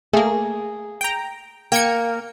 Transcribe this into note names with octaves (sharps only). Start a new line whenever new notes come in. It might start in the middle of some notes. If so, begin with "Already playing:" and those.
A3 A#3 G#4
G5 A#5
A#3 G5 G#6 C#7